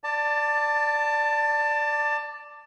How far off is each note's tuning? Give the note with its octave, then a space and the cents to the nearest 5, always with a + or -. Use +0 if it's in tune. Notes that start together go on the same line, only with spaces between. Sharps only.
D5 +0 A5 +20